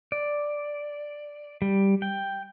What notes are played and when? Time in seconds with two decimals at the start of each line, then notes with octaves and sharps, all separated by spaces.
0.12 D5
1.62 G3
2.02 G5